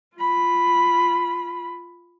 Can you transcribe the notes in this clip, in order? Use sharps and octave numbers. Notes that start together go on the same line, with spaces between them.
F4 B5